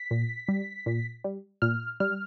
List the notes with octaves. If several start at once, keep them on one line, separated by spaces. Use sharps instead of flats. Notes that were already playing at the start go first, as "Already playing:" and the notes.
Already playing: B6
A#2
G3
A#2
G3
A#2 F6
G3 F6